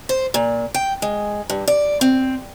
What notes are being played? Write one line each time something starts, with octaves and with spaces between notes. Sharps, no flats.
C5
A#2
G5
G#3
G2
D5
C4